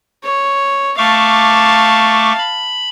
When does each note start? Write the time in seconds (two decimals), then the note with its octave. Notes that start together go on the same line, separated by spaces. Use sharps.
0.23 C#5
0.98 A3 F5 A5 C#6 D6
2.38 B5